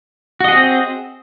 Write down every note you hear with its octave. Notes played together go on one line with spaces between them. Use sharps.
C4 F#4 G#4 D#5